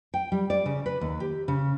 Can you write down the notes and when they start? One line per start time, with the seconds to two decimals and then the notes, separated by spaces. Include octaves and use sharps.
0.14 G5
0.32 G3
0.50 D5
0.66 C#3
0.86 B4
1.01 D#2
1.20 G4
1.48 C#3